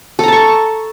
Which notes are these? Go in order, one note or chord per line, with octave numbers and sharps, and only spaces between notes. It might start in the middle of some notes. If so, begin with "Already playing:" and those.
A4 A5 A#5 C#6